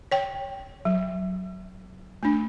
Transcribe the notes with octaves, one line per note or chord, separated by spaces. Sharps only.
C#5 G5
F#3
A3 D4